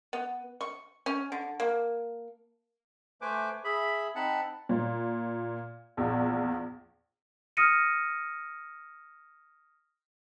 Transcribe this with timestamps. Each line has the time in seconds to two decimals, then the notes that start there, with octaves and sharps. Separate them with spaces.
0.13 B3
0.61 C#6
1.06 C#4
1.32 D3
1.60 A#3
3.21 A3 B4 C5 G#5 D6
3.64 G#4 E5 B5
4.15 C4 D#4 F#5 A5 B5
4.69 A#2
5.97 A#1 E2
7.57 D#6 F6 A#6 C#7 D#7